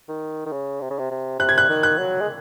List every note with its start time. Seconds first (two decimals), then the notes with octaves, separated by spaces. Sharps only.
0.09 D#3
0.46 D#3
0.52 C#3
0.81 C3
0.90 C#3
0.99 C3
1.11 C3
1.39 C3 F#6
1.49 G#6
1.58 F#6
1.69 D#3
1.83 F#6
1.98 F#3
2.21 G#3